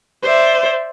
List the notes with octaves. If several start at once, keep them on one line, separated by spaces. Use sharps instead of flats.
C5 D5 E5